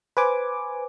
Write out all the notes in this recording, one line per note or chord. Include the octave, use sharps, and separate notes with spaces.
B4 C5 G#5 D6